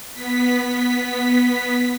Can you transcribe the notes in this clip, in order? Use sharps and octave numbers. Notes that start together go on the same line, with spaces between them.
B3 B6